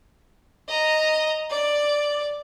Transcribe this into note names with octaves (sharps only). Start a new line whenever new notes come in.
D#5 A#5
D5